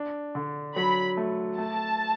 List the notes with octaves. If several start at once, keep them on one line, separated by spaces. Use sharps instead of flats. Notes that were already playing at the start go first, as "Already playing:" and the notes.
Already playing: D4
D3
F#3 B5
A3
A3 A5